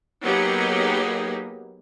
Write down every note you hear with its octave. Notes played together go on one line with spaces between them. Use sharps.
F#3 A#3 B3 D#4 G4 G#4